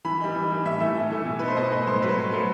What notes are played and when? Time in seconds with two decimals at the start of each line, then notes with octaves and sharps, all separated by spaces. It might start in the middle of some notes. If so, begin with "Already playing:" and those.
0.05 E3 B5
0.20 G3 D#4
0.35 E3
0.51 G3 D#4
0.65 A2 E5
0.80 E3 A3 E5
0.96 A2
1.10 E3 A3
1.25 B2
1.39 A3 D#4 B4
1.48 C5
1.57 B2 D#5
1.72 A3 D#4 B4
1.87 A2 C5
2.02 F#3 A3 B4
2.17 A2
2.32 F#3 A3